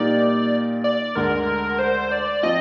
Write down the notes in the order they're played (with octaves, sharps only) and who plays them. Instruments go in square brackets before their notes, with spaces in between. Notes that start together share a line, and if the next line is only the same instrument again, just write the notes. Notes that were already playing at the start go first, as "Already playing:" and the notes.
Already playing: [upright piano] A#2 G3 A#3 D#4 [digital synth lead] D5
[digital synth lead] D5
[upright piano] D2 D3 G#3 [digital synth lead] A#4
[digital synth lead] C5
D5
[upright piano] F3 C4 F4 [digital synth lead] D#5